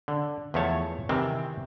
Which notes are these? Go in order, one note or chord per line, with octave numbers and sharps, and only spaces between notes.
D3
E2 F3 A3 C#5 A5
C3 D#3 E3 C4